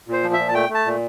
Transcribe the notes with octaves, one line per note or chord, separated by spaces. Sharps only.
A#2 C5
F3
E5
A#2
A5
A3 G5
A3
A5
A#2